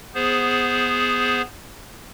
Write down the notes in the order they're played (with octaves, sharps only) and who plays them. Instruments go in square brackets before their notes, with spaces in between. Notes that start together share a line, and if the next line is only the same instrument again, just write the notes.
[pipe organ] B3 G#4 C5